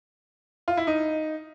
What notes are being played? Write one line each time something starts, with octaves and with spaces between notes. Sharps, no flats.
F4
E4
D#4